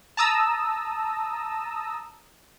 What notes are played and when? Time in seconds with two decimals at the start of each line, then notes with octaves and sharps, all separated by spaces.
0.17 A5 A#5 D#6 E6